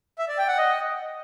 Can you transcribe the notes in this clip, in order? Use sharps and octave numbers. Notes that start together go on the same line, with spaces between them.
E5
D5
G5
F#5
D#5